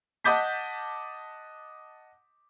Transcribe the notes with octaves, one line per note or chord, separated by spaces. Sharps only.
D#5 F#5 A5 D6 G6 B6